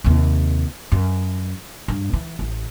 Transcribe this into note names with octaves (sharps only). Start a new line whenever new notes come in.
D#2 C3
F#2
G2
E3
A1